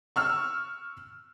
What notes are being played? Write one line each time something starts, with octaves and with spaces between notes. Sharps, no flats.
C#6 E6 F6